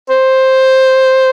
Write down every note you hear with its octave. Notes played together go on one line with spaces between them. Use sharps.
C5